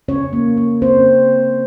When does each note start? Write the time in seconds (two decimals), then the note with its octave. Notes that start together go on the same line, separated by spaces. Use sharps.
0.08 C#3 C#4 C#5
0.33 A#3
0.57 A#3
0.82 C#3 C4 C5